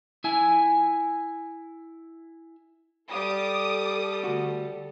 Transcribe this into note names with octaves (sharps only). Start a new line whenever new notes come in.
E4 G#5
G3 A4 D6 D#6
D2 F#4